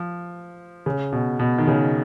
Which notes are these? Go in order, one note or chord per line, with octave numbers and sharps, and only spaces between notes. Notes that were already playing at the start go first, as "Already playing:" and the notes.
Already playing: F3
C#3
B2
B2
D#3
C#3